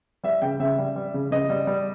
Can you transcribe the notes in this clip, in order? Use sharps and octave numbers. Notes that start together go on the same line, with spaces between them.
G3 E5
C#3 G5
C#3 E5
G3
G3
C#3
C#3 D#5
G3
G3